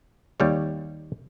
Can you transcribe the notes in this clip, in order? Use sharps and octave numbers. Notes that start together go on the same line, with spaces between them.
D#2 G3 C#5